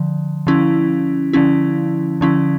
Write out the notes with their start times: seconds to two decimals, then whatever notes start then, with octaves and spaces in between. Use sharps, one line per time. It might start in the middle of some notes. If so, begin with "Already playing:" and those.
Already playing: D3 F3
0.47 D3 F3 C#4 E4
1.33 D3 F3 C#4 E4
2.21 D3 F3 C#4 E4